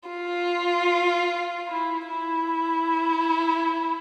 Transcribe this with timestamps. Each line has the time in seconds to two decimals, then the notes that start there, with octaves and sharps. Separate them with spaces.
0.09 F4
1.69 E4
2.08 E4